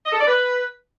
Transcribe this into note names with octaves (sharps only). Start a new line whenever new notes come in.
D#5
A4
D5
B4